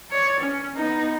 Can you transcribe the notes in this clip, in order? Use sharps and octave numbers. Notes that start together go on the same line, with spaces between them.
C#5 D5
C#4
B3 D#4